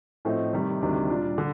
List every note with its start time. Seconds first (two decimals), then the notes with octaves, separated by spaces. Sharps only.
0.25 A2 F3 A3 C4 D#4
0.53 C3 D#3 G3
0.81 D2 C3 D#3 G3 D4
1.09 A#2 G3 D4 F4
1.38 D3